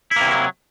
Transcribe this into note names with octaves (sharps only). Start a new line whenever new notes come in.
C3 E3 F#3 A#3 E4